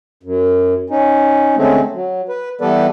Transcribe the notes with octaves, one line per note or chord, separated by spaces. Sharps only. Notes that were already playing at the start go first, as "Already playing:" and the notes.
F#2
C#4 D#4
D3 G#3 A3 C4 C#4
F#3
B4
E3 G3 B3 A4 B4 D5